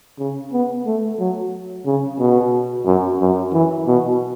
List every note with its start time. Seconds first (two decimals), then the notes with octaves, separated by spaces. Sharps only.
0.19 C#3
0.53 B3
0.86 A3
1.19 F#3
1.86 C#3
2.19 B2
2.86 F#2
3.20 F#2
3.53 E3
3.87 B2